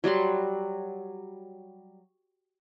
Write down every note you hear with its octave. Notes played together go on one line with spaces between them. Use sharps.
F#3 G3 F#5 C6